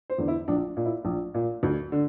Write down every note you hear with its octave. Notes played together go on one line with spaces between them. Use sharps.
C5
E2 D3
E4
A#1 D4
A#2
E4
A#1
A#2
D2
D3